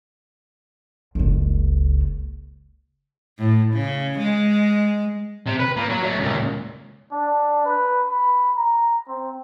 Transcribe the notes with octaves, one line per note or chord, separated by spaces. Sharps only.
F#1 C#2
A2
C#3
G#3
C3
B4
A#2
F#3
F#3 A3
C#2 A#2
D4
B4
B5
A#5
C4